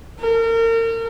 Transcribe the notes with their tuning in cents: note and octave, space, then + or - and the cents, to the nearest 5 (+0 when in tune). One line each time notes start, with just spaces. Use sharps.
A#4 -35